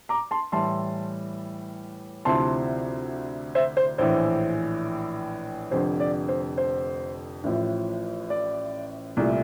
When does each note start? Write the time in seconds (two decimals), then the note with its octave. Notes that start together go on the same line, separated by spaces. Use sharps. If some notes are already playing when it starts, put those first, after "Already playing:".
0.09 A#5 D6
0.31 A5 C6
0.52 A2 E3 G3 A5 C6
2.25 D2 C3 F3 C4 E4 A5 C6
3.55 C5 E5
3.77 C5
3.98 A#1 A2 E3 C5
5.71 F1 F2 D3 C5
6.00 D5
6.28 C5
6.58 C5
7.44 A1 A2 F3
8.30 D5
9.17 C2 A#2 A3 E4